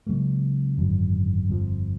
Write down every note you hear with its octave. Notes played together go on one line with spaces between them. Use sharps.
C#2 C#3 F#3 A#3
G#1 F#2 D3 F#3
G1 F2 C#3 F3